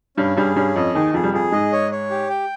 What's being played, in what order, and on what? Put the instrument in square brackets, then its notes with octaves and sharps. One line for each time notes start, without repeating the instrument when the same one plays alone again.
[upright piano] G2 G3 [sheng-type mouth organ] C#4
[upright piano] G2 G3 [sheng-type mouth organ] G#4
[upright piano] G2 G3 [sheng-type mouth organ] C#4
[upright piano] F2 F3 [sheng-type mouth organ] D#5
[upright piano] D#2 D#3 [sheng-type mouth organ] G#4
[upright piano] F2 F3 [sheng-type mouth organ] G#4
[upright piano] G3
[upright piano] F2 F3 [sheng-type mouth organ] G#4
[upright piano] G#2 G#3 [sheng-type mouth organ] D#5
[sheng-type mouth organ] C#5
C#5
G4
G5